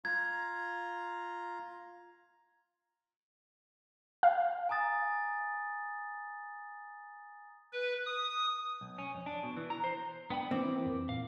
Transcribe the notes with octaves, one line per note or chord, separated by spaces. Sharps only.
F4 A#5 G#6
F5
G#5 A#5 D#6 A6
B4
D#6
B1
C#4
F2
D4
B2
E3
A#5
C5
B3 D4 G5 B5
E3 C4 A#4 D6
F2
A#2 F5